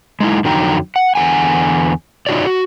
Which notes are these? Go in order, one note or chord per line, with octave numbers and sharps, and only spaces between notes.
G#3 D#4 E4
F2 D3 F#3 D#4 G5 A#5
F#5
E2 D3 A4 F#5 G#5
D#4 F4 F#4 C#5 D5
F#4